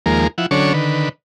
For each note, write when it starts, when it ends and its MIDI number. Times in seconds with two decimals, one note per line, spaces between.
0.06 0.27 39
0.06 0.27 53
0.06 0.27 56
0.06 0.27 58
0.06 0.27 70
0.38 0.46 53
0.38 0.46 64
0.38 0.46 78
0.51 0.73 50
0.51 0.73 54
0.51 0.73 61
0.51 0.73 62
0.51 0.73 69
0.51 0.73 73
0.74 1.09 50
0.74 1.09 51
0.74 1.09 71